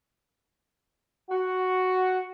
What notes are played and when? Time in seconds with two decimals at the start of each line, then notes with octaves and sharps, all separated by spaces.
1.30 F#4